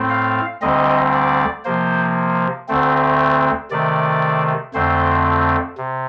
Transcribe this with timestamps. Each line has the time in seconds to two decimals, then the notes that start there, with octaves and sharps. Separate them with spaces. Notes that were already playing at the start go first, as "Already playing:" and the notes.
Already playing: A2 A3 C4
0.10 F5
0.61 D2 D3 G3 C4 D#5
1.14 D5
1.65 C3 F3 A#3 C5
2.68 D2 D3 A3 C4
3.71 C3 D#3 A3 D5
4.74 F2 D3 A3 C4 C5
5.78 C3